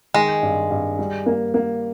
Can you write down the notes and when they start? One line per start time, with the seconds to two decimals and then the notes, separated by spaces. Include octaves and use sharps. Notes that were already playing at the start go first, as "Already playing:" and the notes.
0.14 D#3 G#3
0.43 G2
0.71 G2
0.99 G3
1.26 A#3
1.54 A#3